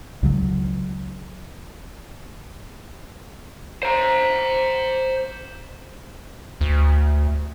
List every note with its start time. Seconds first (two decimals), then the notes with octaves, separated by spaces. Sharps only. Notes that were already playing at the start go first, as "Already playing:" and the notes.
0.23 C#2 C#3 E3 F#3
3.83 C5 A#5
6.61 D2